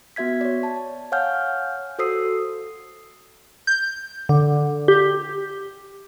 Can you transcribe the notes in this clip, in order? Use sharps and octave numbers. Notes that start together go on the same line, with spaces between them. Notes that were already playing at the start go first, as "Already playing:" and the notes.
B3 F#4 E5 G#6 B6
C#5 D5
A5
C#5 F5 F#5 G#5 F6 G6
F#4 A4 C5 D#6 E6 C7
G6
D3
G4